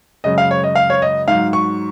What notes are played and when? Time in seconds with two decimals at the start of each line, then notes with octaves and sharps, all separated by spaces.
0.24 F#2 C#3 G#3 D#5
0.38 F5
0.51 C#5
0.64 D#5
0.75 F5
0.90 C#5
1.02 D#5
1.28 G#2 F#3 F5
1.53 C#6